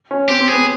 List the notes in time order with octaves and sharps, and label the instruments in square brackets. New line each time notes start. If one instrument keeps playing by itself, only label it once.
[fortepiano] C#4
[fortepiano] C4 [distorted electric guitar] G4
[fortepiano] C4
[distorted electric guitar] G#4
[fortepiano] B3